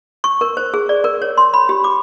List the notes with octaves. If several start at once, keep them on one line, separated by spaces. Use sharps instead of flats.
C#6
A#4
C5
G#4
D5
A#4
C#5
C6
B5
G4
D6